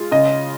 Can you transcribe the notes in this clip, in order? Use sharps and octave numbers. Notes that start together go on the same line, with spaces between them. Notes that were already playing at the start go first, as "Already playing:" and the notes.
Already playing: G#3 F4
C#3 D#5